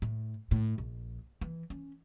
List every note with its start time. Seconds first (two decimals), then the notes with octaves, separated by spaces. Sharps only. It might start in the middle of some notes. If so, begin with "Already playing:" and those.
0.02 A2
0.51 A2
0.78 A#1
1.41 E3
1.70 C#4